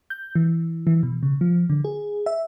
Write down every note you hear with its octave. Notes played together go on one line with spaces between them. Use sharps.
G6
E3
E3
B2
C#3
F3
D3
G#4
E5